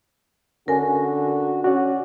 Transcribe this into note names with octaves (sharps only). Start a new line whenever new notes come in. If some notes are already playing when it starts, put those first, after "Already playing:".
D3 C#4 D4 F#4 A#4 G#5
C#4 F#4 D5